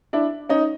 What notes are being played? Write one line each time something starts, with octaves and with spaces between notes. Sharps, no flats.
D4 E4
C#4 D#4